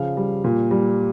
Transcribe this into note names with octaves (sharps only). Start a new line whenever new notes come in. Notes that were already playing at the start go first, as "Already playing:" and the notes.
Already playing: C#3 F3 F5
G3
A#2
G3